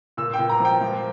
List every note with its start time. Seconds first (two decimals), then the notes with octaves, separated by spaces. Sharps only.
0.17 A#2 E6
0.33 G5
0.39 A#2
0.49 A#5
0.60 F3 G5
0.81 F3